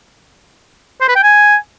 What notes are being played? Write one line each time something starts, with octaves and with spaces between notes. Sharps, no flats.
C5
B4
G5
G#5